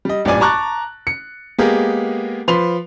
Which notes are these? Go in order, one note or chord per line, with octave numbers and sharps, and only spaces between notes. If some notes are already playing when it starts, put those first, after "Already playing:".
G3 D#5
A1 G2 A#2 D5 G#5 D6
A5 A#5 C#6 D6 F#6 A6
C#7
G#3 A#3 B3 G4 G#4 A#4
F3 B4 C6 F7